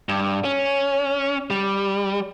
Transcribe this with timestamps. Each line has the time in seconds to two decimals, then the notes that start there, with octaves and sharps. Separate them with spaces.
0.09 G2
0.44 C#4
1.50 G3